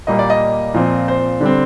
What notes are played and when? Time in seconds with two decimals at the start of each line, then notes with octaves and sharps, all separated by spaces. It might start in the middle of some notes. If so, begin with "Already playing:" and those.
0.07 A#2 G3 A#3 D#5
0.19 D5
0.30 D#5
0.74 A#2 F3 C4
1.08 C5
1.41 D3 G3 C4